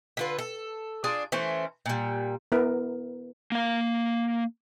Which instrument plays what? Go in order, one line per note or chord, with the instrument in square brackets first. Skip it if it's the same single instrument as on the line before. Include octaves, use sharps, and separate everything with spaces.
[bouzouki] D3 F4 B4
A4
D4 F4 G#4 D5
E3 A3 C#4 C5
A#2 G3
[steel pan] B3 E4 A#4
[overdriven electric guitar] A#3 F5